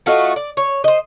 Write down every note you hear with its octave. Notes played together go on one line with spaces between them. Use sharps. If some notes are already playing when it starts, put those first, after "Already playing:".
A3 F4 F#4 D#5
D5
C#5
C5 D#5